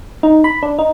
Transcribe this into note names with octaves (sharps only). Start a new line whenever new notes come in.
D#4
B5
D4
D#4